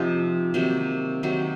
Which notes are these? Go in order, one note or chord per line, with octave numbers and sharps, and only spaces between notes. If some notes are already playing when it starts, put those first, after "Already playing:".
Already playing: C3 F3 C4 D#4
C3 D#3 F#3 A#3
C3 D#3 F#3 A#3